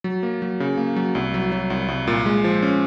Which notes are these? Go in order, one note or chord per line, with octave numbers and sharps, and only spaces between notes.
F#3
A#3
F#3
C#3
A#3
F#3
C2
F#3
F#3
C2
C2
A#2
G#3
F3
C#4